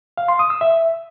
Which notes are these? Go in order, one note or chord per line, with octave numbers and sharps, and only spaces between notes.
F5
C6
D#6
E6
E5